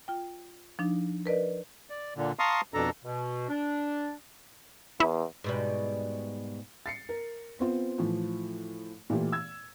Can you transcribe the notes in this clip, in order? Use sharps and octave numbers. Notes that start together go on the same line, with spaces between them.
F4 G5
F3 D4 D#4
A#4 B4 D5 D#5
D5
A#2 D3
F5 A5 A#5 C6 C#6 D#6
F2 B2 D4 A4 A#5
B2
D4
E2 E4
G#2 B2 G3
A6 C7 C#7
A#4
B3 C4 F4
A2 E3 F3
A#2 E3 A3 E4 G4
E6 G#6